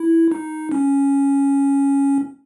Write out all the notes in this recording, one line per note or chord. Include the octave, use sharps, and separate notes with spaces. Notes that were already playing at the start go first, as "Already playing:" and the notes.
Already playing: E4
D#4
C#4